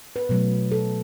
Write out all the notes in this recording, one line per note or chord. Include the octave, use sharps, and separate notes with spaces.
B4
B2 F#3 A3
A4